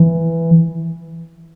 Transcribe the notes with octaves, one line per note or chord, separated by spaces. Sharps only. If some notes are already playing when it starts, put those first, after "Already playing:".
Already playing: E3